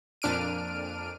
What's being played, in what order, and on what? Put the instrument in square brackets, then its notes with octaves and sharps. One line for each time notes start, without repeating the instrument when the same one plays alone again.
[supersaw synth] F2 A#2 D4 F6 D7 D#7